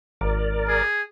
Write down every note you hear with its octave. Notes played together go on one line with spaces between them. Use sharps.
G#1 A#4 D5
G#4